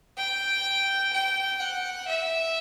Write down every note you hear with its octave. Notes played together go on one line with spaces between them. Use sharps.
G5
G5
F#5
E5